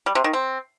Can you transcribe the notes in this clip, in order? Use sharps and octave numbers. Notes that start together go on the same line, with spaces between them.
G3
C3
D#3
C4